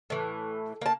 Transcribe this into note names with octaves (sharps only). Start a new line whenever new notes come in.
A2 E3
A#3 A5